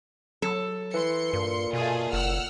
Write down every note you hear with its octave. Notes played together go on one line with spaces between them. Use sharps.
F#3 A4
E3 C6 C#7
G2 A#2
B2 A3 F4 G#4
F#1 F#5 E6 F6